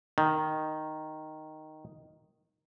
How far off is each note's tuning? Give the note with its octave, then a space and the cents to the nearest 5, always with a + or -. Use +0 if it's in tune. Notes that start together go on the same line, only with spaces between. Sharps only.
D#3 -5